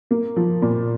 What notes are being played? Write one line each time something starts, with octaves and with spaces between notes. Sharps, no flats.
A#3
F3
A#2